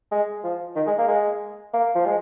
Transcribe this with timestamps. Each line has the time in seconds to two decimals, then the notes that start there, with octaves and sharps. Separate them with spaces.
0.11 G#3
0.43 F3
0.76 D#3
0.86 G#3
0.98 A#3
1.08 G#3
1.73 A#3
1.95 F3
2.06 G#3